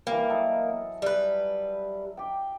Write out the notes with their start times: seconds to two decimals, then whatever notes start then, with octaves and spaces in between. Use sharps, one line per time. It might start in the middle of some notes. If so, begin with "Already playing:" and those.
0.07 E3 G3 A#3
0.29 F#3 A4 D#5
1.02 G3 B4
2.17 G4 G5